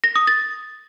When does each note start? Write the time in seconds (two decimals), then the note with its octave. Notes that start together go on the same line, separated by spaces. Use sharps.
0.04 A#6
0.16 D#6
0.27 A6